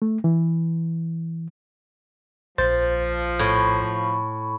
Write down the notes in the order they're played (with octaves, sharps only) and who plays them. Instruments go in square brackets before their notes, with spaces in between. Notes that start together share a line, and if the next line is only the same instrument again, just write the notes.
[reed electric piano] A3
E3
[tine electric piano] A#1 C5 A6 [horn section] F3
[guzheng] A2 [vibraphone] B5 C#6